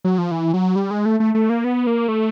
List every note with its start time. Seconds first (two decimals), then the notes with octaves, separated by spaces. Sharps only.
0.04 F#3
0.18 F3
0.31 E3
0.54 F#3
0.76 G3
0.91 G#3
1.05 A3
1.20 A3
1.35 A3
1.50 A#3
1.64 B3
1.87 A#3
2.08 A3